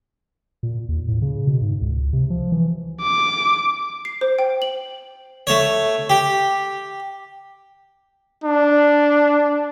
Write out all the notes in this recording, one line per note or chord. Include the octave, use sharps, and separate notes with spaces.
A#2
D#2
A2
C#3
B2
G#2
C#2
C3
F3
E3
D6
C7
C5
G5
F#7
A3 C#5
G4
D4